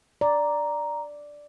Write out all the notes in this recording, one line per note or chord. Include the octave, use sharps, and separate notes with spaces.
D5 A#5